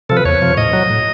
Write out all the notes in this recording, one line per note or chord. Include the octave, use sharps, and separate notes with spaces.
C3 F3 A4
B4
E2 C#5
C3 F3
A2 D#5
F#3
A2